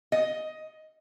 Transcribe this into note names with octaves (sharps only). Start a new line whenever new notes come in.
D#5